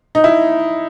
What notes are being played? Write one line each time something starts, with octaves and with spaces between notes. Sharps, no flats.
D#4
E4